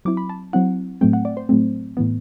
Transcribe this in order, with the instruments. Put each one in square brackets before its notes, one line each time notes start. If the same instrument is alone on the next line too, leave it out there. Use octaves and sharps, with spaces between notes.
[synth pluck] F#3 C4 E4 D6
B5
A5
F#3 C4 E4 F#5
A2 F#3 A3 C4 G5
F#5
D5
C5
A2 F#3 A3 C4
A2 E3 B3